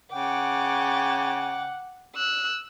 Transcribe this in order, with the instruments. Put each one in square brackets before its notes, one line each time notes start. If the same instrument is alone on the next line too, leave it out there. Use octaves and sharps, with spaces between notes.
[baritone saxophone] C#3 [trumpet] F#5 [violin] G5 D6
[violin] E6 F#6